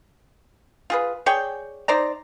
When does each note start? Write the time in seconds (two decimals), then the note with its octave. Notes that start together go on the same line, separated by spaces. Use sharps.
0.90 F4 G#4 B4
1.26 G#4 C#5 D5 G5
1.88 D#4 C5 D5 A#5